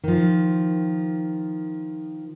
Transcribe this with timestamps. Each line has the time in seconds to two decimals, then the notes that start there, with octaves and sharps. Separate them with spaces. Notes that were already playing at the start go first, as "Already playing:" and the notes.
0.03 D#3 F3